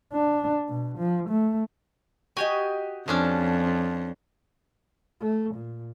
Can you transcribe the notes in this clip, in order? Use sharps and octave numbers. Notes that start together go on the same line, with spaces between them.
D4
B2
F3
A3
F#4 G4 D#5 G#5
F2 F3 C#4 D4
A3
A#2